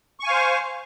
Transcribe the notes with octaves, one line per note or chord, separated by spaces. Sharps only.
C5 F5 G#5 C#6